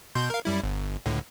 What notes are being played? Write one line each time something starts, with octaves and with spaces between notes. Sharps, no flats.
B2 C6 G6
A#4 F5
F#2 G3 E4
G1
C#2 A2 D3